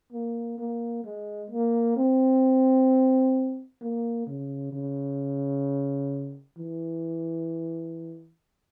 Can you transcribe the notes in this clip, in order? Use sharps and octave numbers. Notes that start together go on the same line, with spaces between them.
A#3
A#3
G#3
A#3
C4
A#3
C#3
C#3
E3